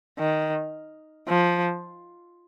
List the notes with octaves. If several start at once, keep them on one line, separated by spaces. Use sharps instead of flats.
D#3
F3